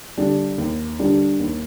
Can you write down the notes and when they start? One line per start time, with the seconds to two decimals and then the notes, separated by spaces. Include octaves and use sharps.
0.17 D3 G3 D4
0.58 D#2
0.99 D3 G3 D4
1.40 D#2